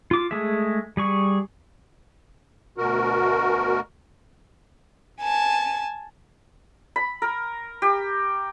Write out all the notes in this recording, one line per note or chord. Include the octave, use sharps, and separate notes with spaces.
F4 D6
G#3 A3 G#4 E5
G3 G#4 C#6
D2 B2 F#4 A#4
G#5 A5
B5
A#4
G4